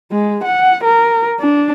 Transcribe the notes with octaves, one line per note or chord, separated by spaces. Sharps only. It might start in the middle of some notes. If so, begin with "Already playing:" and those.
G#3
F#5
A#4
D4